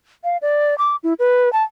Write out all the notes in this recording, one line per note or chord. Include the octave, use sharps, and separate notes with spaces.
F5
D5
D6
E4
B4
A5